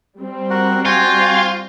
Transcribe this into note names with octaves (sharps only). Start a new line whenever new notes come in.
G3 C4
F#4 A#4 F#5
F4 F#4 G5 G#5